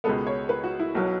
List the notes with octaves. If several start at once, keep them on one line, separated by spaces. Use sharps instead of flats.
C#2 B2 G#3 B3 A4
C#5
B4
F#4
E4
B1 B2 F#3